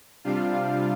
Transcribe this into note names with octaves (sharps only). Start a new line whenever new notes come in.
C3 G3 D4 F4 F5